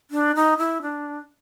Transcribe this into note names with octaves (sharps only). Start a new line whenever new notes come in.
D4
D#4
E4
D4